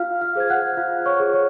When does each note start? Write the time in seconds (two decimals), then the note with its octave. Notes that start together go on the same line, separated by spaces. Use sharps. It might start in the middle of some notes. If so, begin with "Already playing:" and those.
Already playing: F4 F5 F6
0.21 F5 F6
0.35 G#4 C5 G#6
0.50 F#5 F#6
0.77 F4 F5 F6
1.06 C#5 C#6
1.20 G#4 C5
1.33 C#5 C#6